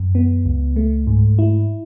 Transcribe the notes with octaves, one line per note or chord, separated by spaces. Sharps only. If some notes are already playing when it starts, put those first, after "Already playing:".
Already playing: F#2
B3
C#2
A3
G#2
E4